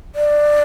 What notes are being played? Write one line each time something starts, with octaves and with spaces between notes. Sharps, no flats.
D5